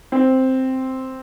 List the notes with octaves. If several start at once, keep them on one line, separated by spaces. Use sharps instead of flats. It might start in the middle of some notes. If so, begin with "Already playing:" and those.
C4